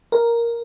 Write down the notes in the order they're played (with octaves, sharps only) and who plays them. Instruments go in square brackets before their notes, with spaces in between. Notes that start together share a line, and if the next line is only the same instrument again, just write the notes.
[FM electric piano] A#4